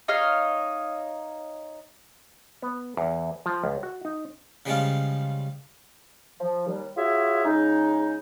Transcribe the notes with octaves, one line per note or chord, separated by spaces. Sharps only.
D#4 C#5 D#5 F5
B3
E2
F3
C#2
F#4
D#4
C#3 F3 G3 G#3 C#4 F4
F3
D#2 G3
F4 F#4 G#4 C#5 E5
C#3 G#3 D#4